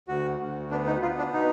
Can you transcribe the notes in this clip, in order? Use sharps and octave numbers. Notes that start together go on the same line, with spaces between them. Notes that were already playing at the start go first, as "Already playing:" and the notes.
D2 F#4
D2
B3 D4
D#4
B3 F4
D4
B2 D#4